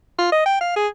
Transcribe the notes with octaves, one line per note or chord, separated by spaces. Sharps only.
F4
D#5
G5
F5
G#4